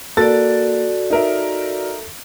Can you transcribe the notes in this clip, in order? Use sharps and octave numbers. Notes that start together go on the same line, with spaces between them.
A#3 F#4 A4 D5 A6
D#4 A#4 E5